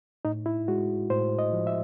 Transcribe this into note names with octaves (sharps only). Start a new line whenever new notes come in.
A2 D#4
E4
G#3 F#4
A2 C5
D#5
F3
E5